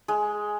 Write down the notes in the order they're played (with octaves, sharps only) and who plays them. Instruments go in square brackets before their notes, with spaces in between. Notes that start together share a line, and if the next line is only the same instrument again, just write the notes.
[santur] G#3